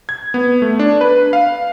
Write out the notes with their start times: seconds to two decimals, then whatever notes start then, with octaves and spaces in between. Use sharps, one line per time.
0.09 G#6
0.34 B3
0.62 A3
0.79 D4
1.01 B4
1.33 F5